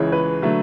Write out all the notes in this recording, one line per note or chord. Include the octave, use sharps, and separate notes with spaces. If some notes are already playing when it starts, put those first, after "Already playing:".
Already playing: C#2 C#3 E3 C#5
B4
D3 F#3 A3